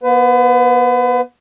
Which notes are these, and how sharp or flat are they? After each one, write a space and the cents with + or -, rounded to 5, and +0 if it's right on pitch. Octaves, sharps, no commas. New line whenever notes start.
B3 -35 B4 +35